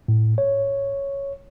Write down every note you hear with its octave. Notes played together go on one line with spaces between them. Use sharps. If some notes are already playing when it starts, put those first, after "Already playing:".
A2
C#5